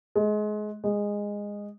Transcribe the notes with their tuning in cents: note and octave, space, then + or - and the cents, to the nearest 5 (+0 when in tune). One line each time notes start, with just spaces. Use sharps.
G#3 +25
G#3 -15